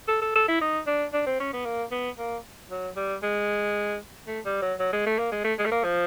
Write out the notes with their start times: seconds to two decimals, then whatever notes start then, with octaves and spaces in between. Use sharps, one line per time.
0.08 A4
0.22 A4
0.35 A4
0.48 E4
0.61 D#4
0.87 D4
1.13 D4
1.26 C4
1.40 C#4
1.53 B3
1.65 A#3
1.91 B3
2.19 A#3
2.70 F#3
2.96 G3
3.23 G#3
4.27 A3
4.45 G3
4.62 F#3
4.79 F#3
4.93 G#3
5.06 A3
5.19 A#3
5.32 G#3
5.44 A3
5.59 G#3
5.65 A3
5.72 A#3
5.84 F3